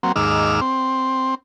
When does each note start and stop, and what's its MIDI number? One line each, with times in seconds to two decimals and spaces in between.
0.03 0.12 54
0.03 0.12 58
0.03 0.12 60
0.16 0.60 39
0.16 0.60 44
0.16 0.60 86
0.16 0.60 88
0.16 0.60 89
0.61 1.35 60